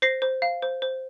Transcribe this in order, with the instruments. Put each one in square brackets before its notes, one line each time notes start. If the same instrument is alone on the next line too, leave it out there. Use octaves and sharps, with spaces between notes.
[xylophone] C5 A#6 C7
C5
F5
C5
C5